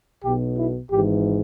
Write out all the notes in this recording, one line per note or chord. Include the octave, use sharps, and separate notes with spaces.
B1 B2 G4
E4
G#1 G#2 E3 G4